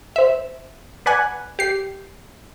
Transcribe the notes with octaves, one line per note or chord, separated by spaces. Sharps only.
C5 E5
B4 D5 F#5 G#5
G4 C7